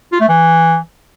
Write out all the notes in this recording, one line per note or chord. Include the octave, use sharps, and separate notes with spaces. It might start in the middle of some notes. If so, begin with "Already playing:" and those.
F4
A3
E3